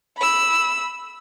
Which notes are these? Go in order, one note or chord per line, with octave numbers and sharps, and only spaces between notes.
B5 E6